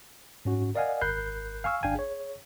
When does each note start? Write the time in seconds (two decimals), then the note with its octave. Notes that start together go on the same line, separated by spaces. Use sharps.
0.45 G#2 C#4 F#4
0.75 A#4 D5 D#5 F5 F#5 G#5
1.01 G#1 A#4 B5 F#6 G6 C7
1.64 F5 G#5 C#6 E6 F6
1.83 G#1 D4 F5 G5 G#5
1.95 G#4 C#5